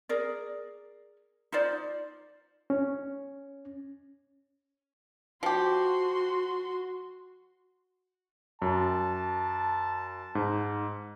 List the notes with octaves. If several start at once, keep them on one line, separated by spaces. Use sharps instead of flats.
G#4 A#4 D5
D#4 F4 C5 D5
C#4
F3 F#4 G4 C6
F#2 A5
G#2